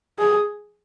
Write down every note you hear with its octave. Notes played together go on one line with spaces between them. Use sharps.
G#4